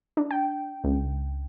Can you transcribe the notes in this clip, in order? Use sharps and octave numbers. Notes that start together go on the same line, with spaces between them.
D4
G5
C#2